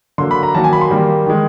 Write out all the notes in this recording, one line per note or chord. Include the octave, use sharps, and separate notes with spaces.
D3 F#3 A#3 C6
B5
A#5
D#3 F#3 A#3 A5
G#5
B5
C6
D#3 G3 A#3
D#3 G#3